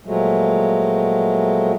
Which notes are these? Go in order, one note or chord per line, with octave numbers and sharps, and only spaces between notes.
A#2 F3 F#3 G#3 A3